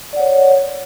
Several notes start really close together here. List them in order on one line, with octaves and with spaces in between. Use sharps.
D5 F#5 C#5